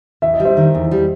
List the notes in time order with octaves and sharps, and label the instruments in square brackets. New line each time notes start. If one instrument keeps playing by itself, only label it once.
[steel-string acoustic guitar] E2 [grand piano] E5
[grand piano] D#5
[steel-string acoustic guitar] G3
[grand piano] C5 E5
[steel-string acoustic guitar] D#3
E2
G3